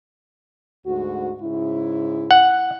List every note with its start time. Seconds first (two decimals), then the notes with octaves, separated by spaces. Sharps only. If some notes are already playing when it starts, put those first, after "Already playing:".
0.86 D2 G#2 F#4
1.41 G#2 C#3 E4
2.31 F#5